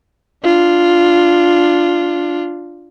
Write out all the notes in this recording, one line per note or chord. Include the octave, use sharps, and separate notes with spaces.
D4 F4